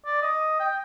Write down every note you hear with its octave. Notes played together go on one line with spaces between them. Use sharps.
D5
D#5
G5